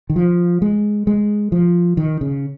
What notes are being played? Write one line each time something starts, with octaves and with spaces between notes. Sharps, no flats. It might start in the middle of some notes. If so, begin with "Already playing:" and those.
D#3
F3
G#3
G#3
F3
D#3
C#3